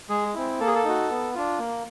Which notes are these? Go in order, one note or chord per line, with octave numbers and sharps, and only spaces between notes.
G#3 G#4
C4 E4
A#3 A4
G#4
A4
D#4 F#4
B3
D4 F4
A#3